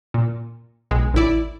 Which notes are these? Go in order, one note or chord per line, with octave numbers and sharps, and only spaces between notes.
A#2
B1 G#3
A1 D#2 E4 D5